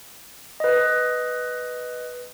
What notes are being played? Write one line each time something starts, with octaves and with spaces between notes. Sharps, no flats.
B4 D#5